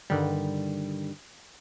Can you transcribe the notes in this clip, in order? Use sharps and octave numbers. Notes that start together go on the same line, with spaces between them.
G2 D3 D#3 G3